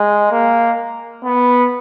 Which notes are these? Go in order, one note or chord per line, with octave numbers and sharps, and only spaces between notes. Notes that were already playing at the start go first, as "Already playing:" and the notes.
Already playing: G#3
A#3
B3